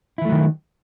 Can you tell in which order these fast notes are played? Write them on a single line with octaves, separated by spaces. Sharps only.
E4 E3 A3 F#3 D#3